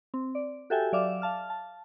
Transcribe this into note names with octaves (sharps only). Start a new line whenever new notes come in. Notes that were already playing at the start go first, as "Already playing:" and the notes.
C4
D5
F#4 G4 A4 E5 G5 G#5
F#3 D5 E5 F5 D6 E7
F5 A5 F6
A5